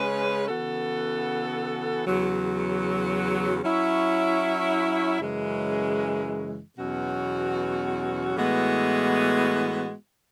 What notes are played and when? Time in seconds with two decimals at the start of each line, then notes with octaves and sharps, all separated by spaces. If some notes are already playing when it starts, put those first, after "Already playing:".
Already playing: C#3 G#3 C#4 G#4 B4
0.48 C#3 E3 B3 F#4 A4
2.05 E2 C#3 F#3
3.62 F#3 C#4 E4
5.19 F#2 C#3 E3 G#3
6.77 E2 B2 F#3 C#4 F#4
8.34 A2 E3 G#3 B3 F#4